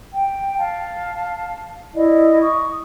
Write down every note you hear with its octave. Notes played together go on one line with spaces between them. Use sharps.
G5
F5 A5
E4 D5 D#5
C#6 D#6